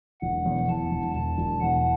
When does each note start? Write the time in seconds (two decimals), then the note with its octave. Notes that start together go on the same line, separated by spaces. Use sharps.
0.21 E1 F#5
0.46 E2
0.68 E2 A5
0.91 E1
1.15 E1 A5
1.38 E1
1.61 E2 F#5